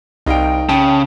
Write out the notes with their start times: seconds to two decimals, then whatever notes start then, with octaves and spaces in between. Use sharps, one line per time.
0.26 C2 D#4 F5 G5 D7
0.69 C#3 G5 A5